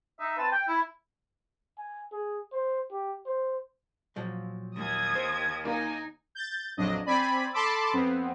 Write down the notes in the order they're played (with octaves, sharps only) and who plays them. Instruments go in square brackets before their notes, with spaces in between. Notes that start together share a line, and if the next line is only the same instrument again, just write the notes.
[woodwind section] D#4 E5
C4 B4 A5
G5
E4
[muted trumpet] G#5
G#4
C5
G4
C5
[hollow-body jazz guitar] A#2 F3 F#3
[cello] D#2 [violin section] D#6 G#6
[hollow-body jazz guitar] C5
[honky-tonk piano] A#3 [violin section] D#4 G#5
[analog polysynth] G6 A6
A#1 F2 F#3 D4 D#5
C4 D5 G#5 B5
A4 A5 B5 C6 D6 E6
F2 B3 C4